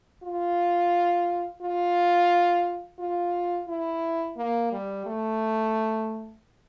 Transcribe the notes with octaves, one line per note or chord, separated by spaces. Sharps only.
F4
F4
F4
E4
A#3
G3
A3